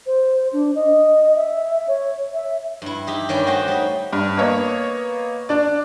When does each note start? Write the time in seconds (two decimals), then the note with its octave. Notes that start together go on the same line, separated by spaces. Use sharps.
0.06 C5
0.53 D4
0.75 D#5
1.36 E5
1.88 C#5
2.33 E5
2.82 G2 E4
3.07 D#4 G4 E5
3.29 G2 D#3 C#4 C#5 D5 G5
3.46 A3 F#4 G4 C5 D#5 G5
3.68 G3 D#4
4.13 G2
4.37 A#3 B3 C#5 D#5
5.49 D4 D5